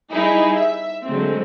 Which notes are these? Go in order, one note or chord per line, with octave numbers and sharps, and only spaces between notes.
G3 D#4 E4 G#4
E5
D3 F#3 G#3 A3 C4